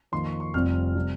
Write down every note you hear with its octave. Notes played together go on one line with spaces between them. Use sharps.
F2 D#3 A#3 C6
C#6
C#6
F1 F2 C3 G3 C4 F6
C3 G3